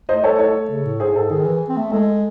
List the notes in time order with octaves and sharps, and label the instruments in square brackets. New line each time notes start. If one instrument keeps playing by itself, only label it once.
[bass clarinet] A3 [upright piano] C5 D#5
[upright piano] A4 C#5
A4 C#5
[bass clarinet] C#3
A2
[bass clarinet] G#2 [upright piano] G#4 C5
[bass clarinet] G#2 [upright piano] A4
[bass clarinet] D#3 [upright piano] G#4
[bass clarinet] E3
C4
A3
[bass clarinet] G#3 [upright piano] A4